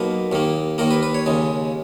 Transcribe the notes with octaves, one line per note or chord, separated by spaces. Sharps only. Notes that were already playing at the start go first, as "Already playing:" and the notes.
Already playing: B1 B2 A#3 B4
D#2 D#3 A#3
D#2 D#3 A#3 A#4
B4
B4
C#5
D#2 C#3 G#3